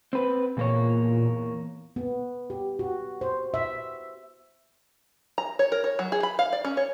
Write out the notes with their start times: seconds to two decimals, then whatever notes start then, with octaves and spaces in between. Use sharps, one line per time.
0.13 C4 B4
0.57 E2 A#2 A#3 C#5
1.96 B3
2.50 G4
2.79 F#4
3.21 C5
3.54 E5
5.38 A#5
5.59 C#5
5.72 A#4
5.84 C#5
5.99 F#3
6.12 G#4
6.23 B5
6.39 F5
6.52 D5
6.65 C#4
6.77 C#5